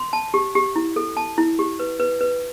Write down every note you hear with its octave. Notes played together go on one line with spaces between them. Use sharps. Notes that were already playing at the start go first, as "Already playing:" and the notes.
Already playing: C6
A5
G4
G4
E4
A4
A5
E4
G4
B4
B4
B4